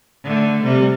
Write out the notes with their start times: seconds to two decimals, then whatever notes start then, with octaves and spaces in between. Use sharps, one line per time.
0.24 D3 A3
0.64 C3 G3